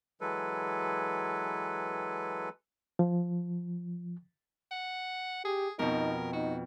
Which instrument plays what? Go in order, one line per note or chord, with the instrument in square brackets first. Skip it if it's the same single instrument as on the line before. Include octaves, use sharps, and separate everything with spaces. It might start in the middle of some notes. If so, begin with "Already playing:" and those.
[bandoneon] E3 F#3 G#3 A4 B4
[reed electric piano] F3
[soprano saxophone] F#5
[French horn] G4 [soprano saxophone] G#4
[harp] F2 B2 [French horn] D#4 [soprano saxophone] A#4
[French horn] D#4 [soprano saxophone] F#4